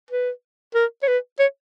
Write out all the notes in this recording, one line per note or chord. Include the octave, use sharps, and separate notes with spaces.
B4
A#4
C#5
B4
C#5